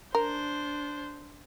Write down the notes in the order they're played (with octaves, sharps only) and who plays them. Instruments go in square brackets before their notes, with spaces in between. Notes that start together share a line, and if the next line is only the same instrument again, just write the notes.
[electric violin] D4 C5 [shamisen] A#4